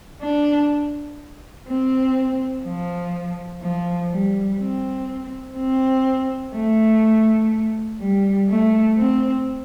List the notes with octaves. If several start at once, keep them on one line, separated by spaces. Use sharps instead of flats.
D4
C4
F3
F3
G3
C4
C4
A3
G3
A3
C4